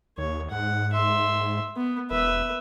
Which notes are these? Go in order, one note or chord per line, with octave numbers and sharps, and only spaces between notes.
D#2 C#5
G#2 F#5
E5 C6
B3
E1 B4 E5